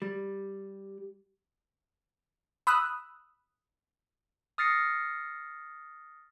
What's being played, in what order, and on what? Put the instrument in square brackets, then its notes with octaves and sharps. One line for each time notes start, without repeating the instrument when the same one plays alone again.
[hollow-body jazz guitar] G3
[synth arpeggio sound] B5 D#6 E6 F#6
[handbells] D#6 F6 A6 A#6 C7 C#7